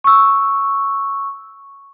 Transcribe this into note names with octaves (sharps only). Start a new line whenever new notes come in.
C#6 E6